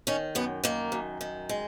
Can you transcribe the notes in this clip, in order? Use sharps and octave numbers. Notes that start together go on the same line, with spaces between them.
D#3 C#4
F#2 B3
D#3 A#3
F#2
D#3
G#3